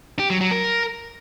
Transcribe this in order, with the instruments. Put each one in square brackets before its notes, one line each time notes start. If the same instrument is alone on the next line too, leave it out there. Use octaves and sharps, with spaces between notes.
[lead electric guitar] G4
F#3
F#3
A#4